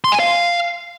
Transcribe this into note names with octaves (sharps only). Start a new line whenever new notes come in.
C6
G#5
F5